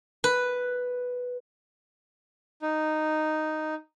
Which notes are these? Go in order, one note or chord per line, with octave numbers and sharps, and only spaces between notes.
B4
D#4